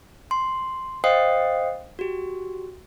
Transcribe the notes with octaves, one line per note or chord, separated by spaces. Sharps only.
C6
C5 D#5 F5 G5 D#6 C7
F#4 G4